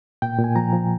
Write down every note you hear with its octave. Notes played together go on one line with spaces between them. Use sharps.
A#2 G5
A#2
G#5
F3 A#5
F3